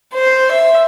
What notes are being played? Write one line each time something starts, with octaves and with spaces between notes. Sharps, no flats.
C5
E5